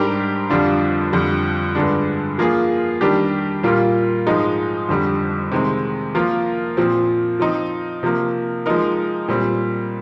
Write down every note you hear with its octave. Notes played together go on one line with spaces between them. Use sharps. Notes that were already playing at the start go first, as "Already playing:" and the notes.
Already playing: G#2 G3 D4 G4 A#4
F2 D3 G3 D4 F4
F2 D3 G3
G2 D3 G#3 D4
F3 A#3 F4 G#4
D#3 G3 D4 G4
A#2 G3 A#3 F4
G#2 F3 G#3 D#4
F2 D3 G3
C3 D#3 G#3 C4
F3 A#3 F4 A#4
A#2 F3 C4
F3 C4 D#4
C3 F3 A#3
F3 G#3 D#4 A#4
A#2 G3 C4